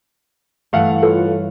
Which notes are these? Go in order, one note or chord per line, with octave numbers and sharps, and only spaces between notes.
G2 E3 A3 F5 F#5
F4 A4 B4 C#5